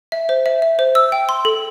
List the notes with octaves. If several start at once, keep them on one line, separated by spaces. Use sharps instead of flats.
E5
C5
E5
E5
C5
E6
G5
C6
A4